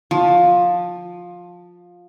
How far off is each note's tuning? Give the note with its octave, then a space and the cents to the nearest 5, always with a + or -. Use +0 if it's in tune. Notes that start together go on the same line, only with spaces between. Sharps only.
F3 +15